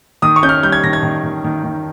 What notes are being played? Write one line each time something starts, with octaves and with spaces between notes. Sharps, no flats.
D#3 D#6
C#6
C#4 G6
F6
G3 G6
G#6
D#3 A#6
G#6
D#3
D#3
D#3
D#3